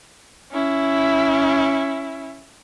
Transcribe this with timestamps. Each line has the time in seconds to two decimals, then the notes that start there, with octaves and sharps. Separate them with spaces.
0.51 C#4 E4